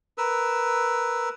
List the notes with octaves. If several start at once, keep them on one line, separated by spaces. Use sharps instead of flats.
A#4 B4 E6